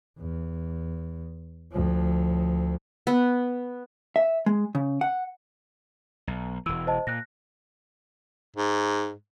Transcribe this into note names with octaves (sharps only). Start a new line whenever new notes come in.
E2
D2 F3
B3
E5
G#3
C#3
F#5
B1
E1 E3 E6
C5 D#5 A5
A#2 F#6 A#6
G#2